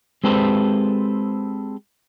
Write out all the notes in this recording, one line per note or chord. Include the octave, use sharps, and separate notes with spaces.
G#3 C4 G4 A4 B4 C5